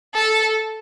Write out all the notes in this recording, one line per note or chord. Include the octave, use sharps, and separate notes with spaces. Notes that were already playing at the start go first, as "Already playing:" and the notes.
A4